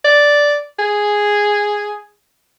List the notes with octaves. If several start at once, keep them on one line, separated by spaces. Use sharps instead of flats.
D5
G#4